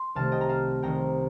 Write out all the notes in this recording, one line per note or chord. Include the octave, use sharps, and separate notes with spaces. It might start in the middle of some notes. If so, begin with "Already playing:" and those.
Already playing: C6
C2 C3 D#3 A3 F5 A5
D#5 G5
A#5
F5 A5
C2 C3 D#3 G5 A#5